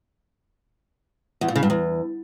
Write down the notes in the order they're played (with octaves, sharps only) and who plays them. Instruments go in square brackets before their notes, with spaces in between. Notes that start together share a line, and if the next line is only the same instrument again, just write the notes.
[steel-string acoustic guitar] E2
A#2
C#3
G2
E2